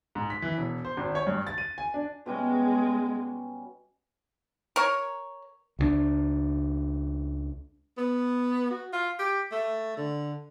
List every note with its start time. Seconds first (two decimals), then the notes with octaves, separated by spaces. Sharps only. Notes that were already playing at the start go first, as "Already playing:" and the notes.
0.15 G#2
0.30 B6
0.42 E3
0.58 E1
0.85 C5
0.97 G#1
1.15 C#5
1.27 G2
1.47 A6
1.58 D#7
1.78 G#5
1.94 D4
2.26 B2 G3 G#3 C#4
4.76 A#4 C#5
5.79 C#2 F3 D4
7.98 B3
8.70 F#4
8.93 F4
9.19 G4
9.52 A3
9.97 D3